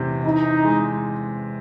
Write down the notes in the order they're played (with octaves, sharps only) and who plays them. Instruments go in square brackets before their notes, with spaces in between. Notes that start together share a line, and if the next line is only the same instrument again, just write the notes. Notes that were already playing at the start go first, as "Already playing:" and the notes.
Already playing: [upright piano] E2 C3
[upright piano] E3 [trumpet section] D#4
[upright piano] G#3